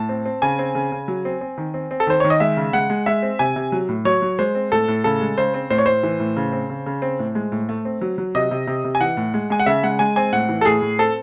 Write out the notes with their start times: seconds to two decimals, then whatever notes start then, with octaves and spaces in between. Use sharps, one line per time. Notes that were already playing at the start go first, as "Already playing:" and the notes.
Already playing: A2 A5
0.09 C4
0.25 C4
0.42 C#3 G#5
0.59 C4
0.75 C#3
0.92 C#3
1.08 F#3
1.25 C4
1.41 C4
1.58 D#3
1.74 C4
1.91 C4
2.00 A4
2.07 D#3 C5
2.20 D#3 C#5
2.30 D#5
2.40 G#3 E5
2.57 C#3
2.73 G#3 F#5
2.90 G#3
3.06 G#3 E5
3.23 C4
3.39 C3 G#5
3.56 C3
3.72 F#3
3.89 A2
4.05 F#3 C#5
4.22 F#3
4.39 G#3 C5
4.55 C4
4.72 A2 A4
4.88 A2
5.04 C#3 A4
5.21 G#3
5.38 C#3 C5
5.54 C4
5.70 A2 C5
5.78 C#5
5.86 A2 C5
6.03 E3
6.20 A2
6.37 C#3
6.53 C4
6.70 C#3
6.86 C#3
7.02 C4
7.19 A2
7.35 G#3
7.52 A2
7.69 A3
7.85 C4
8.02 F#3
8.18 F#3
8.35 C3 D#5
8.51 C3
8.67 C3
8.84 C3
8.95 G#5
9.01 E3 F#5
9.17 A2
9.34 G#3
9.50 G#3 G#5
9.60 F#5
9.66 C#3 E5
9.83 G#3 F#5
9.99 G#3 G#5
10.16 C4 G#5
10.33 A2 F#5
10.49 E3
10.61 A4
10.65 A2 G#4
10.82 A2
10.99 C4 A4